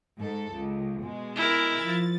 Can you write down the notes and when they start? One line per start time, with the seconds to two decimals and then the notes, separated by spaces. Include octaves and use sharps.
0.19 G#2 A4
0.52 C#2
1.00 B2 G#3
1.36 E4 A#4
1.78 F3 A6